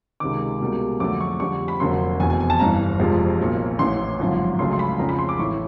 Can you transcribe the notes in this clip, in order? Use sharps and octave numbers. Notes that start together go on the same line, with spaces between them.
C#2 C3 D#3 D6
C#2 B2 G3 A#3
F2 D3 F#3 A3 D6
C#6
F2 D3 G3 C#6
B5
F1 F2 D3 F#3 A#3 C6
F1 E2 B2 G#5
G#5
G#5
A5
G1 G2 E3 A#5
F1 F2 C3 F3 G#3
B1 A#2 F#3
A1 A2 E3 C6
G#1 F#2 D3 F3
C#2 C#3 F#3 A3 C6
C6
B5
F2 C#3 F3 A#5
B5
C6
D6
A1 A2 E3 A3 C#6